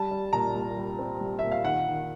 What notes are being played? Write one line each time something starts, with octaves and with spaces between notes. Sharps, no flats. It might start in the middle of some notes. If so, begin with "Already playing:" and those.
Already playing: G3 A5
G3
A#2 A#5
C2
G3
C4
C2
A#2 E5
F5
D#3 F#5
D#3